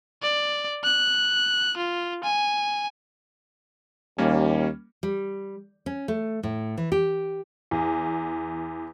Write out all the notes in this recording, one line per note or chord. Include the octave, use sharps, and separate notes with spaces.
D5
F#6
F4
G#5
D#2 G3 A#3 C#4
G3
C#4
A3
A2
E3
G4
E2